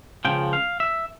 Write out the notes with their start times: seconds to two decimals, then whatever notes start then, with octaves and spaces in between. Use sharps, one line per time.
0.25 C#2 C#3 F3 G5
0.53 F5
0.80 E5